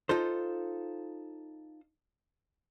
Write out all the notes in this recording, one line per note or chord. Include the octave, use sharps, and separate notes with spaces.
D#4 F4 A4 C5